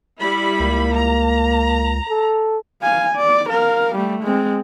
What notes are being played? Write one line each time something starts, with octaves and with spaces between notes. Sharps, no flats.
G3 E4 B5
C#2 A#3
A#5
A4
F5 G#5
D5
A#4 F5
G3 A3
G#3 C4